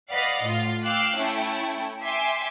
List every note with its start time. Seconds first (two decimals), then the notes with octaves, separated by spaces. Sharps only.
0.11 B4 D5 D#5 F5 F#5
0.43 A2 F4
0.85 F5 G5 D6 E6 F#6 C7
1.17 A3 C#4 E4 G5
2.02 E5 G5 G#5 C6 D6